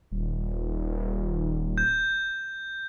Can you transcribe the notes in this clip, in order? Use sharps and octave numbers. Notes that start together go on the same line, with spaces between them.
D#1
G6